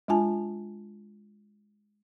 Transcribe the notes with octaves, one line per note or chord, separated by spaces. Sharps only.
G#3 D4 F4 G#5 A5